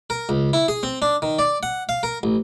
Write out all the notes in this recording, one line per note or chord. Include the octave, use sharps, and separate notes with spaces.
A#4
C#2
E4
G#4
C4
D4
D#3
D5
F#5
F5
A#4
A1